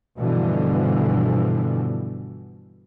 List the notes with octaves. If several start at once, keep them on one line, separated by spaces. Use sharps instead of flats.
G2 B2 D3 E3 F3